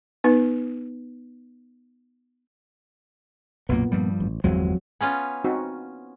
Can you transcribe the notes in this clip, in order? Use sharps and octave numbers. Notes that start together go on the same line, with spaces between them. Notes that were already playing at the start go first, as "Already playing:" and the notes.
B3 D#4 B4
B1 F#2 A#2 A#3 B3
G2 F3 G3
A1
G1 E2 F3 F#3 G#3 C4
B3 C#4 F4 G#5
C4 D#4 F#4